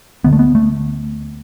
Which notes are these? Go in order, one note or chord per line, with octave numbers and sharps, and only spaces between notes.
D2 D3 B3
A3
B3
A3